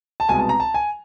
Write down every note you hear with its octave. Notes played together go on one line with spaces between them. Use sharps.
A5
C2 B2 G#3 B3 G#5
A5
A#5
A5
G#5